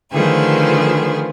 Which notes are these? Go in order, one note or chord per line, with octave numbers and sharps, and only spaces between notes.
D3 D#3 F3 A3 G#4 B4